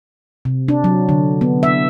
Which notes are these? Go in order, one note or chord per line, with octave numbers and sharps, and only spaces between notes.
C3
D4
F#3
D3
B3
E5